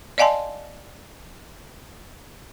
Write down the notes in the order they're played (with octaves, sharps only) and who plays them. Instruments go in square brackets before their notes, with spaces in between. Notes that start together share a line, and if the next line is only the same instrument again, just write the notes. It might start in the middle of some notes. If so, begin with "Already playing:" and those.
[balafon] D5 D#5 F5 G#5 A5 C6